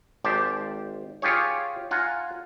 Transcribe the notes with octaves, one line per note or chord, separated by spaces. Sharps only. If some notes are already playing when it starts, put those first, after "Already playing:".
G#1 G4 C5 D5 A5
F4 G4 G#4 C#5
F4 F#5 G#5 A#5